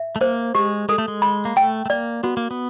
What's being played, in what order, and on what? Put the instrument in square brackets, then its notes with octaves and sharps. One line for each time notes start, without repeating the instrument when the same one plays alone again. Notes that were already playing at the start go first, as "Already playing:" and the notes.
Already playing: [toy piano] E5
[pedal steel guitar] A3
[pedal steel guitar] A#3 [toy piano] C5
[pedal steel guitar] G#3 [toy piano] G4
[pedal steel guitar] G#3 [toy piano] A4
[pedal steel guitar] A3
G#3
[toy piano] B5
[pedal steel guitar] A#3
[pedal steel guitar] A3 [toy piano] G5
[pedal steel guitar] A3
[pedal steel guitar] A#3 [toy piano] D5
[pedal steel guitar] B3 [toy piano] F#4
[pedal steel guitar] A#3
B3